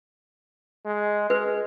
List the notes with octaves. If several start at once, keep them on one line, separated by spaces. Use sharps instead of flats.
G#3
G#3 B4